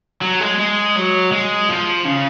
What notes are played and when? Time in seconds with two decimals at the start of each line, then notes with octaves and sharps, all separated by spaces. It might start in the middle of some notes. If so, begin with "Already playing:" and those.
0.22 F#3
0.41 G#3
0.59 G#3
0.96 F#3
1.32 G#3
1.69 F3
2.05 C#3